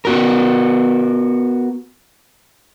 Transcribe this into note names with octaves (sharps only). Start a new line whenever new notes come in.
B3 F#4 A#4